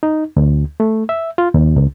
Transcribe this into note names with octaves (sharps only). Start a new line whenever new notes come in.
D#4
D2
A3
E5
F4
D#2
C#2